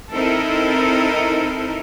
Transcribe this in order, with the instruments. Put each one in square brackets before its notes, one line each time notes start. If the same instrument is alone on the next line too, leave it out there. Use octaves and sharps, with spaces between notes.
[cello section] C4 D#4 E4 A4 A#4